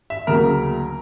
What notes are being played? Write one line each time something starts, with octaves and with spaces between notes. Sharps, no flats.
E5
D2 C#3 F#3 A#3 A#4